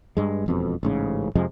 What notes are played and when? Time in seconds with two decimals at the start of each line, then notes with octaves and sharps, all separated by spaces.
0.17 G2 G#3
0.46 E1 F2 B2
0.83 A1 G#2 C#3
1.35 F2 C3 F3 G#3